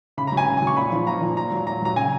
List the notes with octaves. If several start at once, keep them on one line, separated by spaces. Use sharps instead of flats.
C#3 B5
A#5
F#3
G#5
C#3
G#5
F#3
C#6
A#2 B5
F3
A#2 A#5
F3
A#2 A#5
F#3
A#2 A#5
F#3 A#5
C#3 G#5